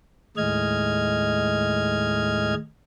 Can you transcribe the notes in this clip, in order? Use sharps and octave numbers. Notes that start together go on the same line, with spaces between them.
D#2 A2 G#3 D#5 F6 G#6